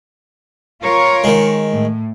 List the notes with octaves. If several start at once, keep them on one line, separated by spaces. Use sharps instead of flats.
F4 A#4 C#5
D#3 G#3
A2